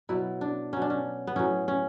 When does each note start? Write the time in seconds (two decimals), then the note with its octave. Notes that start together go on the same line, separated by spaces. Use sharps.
0.09 B2 F#3 E4
0.41 D4
0.73 B2 F#3 C#4
0.82 D4
0.90 C#4
1.27 B3
1.36 A2 F#3 C#4
1.68 C#4